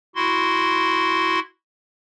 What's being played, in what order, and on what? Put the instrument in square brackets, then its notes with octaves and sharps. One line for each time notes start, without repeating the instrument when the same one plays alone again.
[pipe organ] E4 F#4 C6